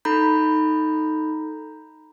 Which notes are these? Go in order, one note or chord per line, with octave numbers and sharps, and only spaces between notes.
D#4 A4 A#5 B5 G6